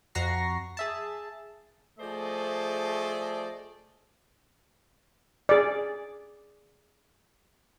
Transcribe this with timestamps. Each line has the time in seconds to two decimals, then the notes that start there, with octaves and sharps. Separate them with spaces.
0.15 F2 F#4 A#5 C#6 A#6 C7
0.77 G#4 E5 A5
1.99 F3 A3 G#4 C5 D5 D#5
5.49 G#4 D5